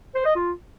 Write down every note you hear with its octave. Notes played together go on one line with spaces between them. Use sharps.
C5
D#5
F4